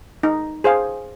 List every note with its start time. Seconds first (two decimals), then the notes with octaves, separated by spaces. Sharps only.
0.23 D#4
0.64 G#4 C5 F5